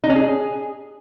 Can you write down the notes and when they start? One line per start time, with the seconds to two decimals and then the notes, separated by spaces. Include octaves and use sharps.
0.04 D#4
0.10 C#4
0.16 G#4